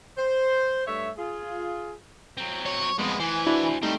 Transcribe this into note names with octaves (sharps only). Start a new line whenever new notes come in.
C5
G2 A3 C#5 E5
F4 G#4
F#3 C4
C#5
F2 G#3 B3
E3 C5 G#5
D4 E4 F#4
G3 A3 C4 D#4